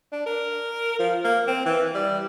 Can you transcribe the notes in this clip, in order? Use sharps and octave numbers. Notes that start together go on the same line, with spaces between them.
D4
A#4
F3
A#3
C4
E3
G3